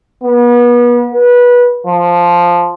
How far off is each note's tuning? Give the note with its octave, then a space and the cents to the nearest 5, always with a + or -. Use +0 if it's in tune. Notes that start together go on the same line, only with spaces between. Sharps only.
B3 -35
B4 -20
F3 +0